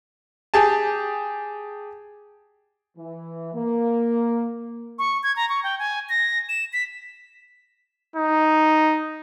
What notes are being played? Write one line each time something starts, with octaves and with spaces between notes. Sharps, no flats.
G4 G#4 A5
E3
A#3
C#6
G#6
A#5
C#6
G5
G#5
A#6
E7
B6
D#4